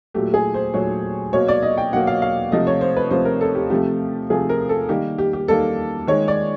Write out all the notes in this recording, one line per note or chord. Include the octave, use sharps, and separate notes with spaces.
A#2 F#3 A3 G4
G#4
C5
A#2 F#3 A3 C#5
B2 F#3 A#3 C#5
D5
D#5
G5
B2 F#3 A#3 F#5
F5
F5
C3 F3 A3 D#5
C#5
C5
B4
C3 F3 A3 C5
A#4
A4
G4
C3 F3 A3 G4
C3 F3 A3 G#4
A#4
A4
D#3 G3 A#3 G4
G4
G4
D#3 G3 A#3 A4
D#3 G#3 C#5
D5